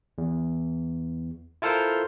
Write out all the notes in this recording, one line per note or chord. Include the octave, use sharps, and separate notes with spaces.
E2
E4 F4 A4 A#4 C5